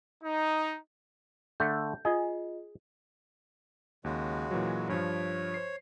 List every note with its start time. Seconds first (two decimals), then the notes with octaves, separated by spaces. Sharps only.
0.22 D#4
1.60 D3 A3 G6
2.05 F4 G#4 D#5
4.04 D#2 C#3 G#3 F#4
4.51 A#2 E3 F#3
4.89 G2 F3 C#5
5.54 C5 C7